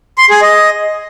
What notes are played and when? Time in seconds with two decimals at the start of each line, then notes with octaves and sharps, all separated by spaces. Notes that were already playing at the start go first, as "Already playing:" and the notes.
0.18 C6
0.30 G#4
0.42 D#5